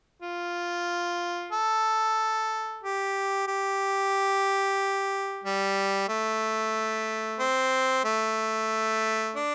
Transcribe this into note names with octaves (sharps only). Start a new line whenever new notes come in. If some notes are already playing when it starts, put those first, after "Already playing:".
F4
A4
G4
G4
G3
A3
C4
A3
D4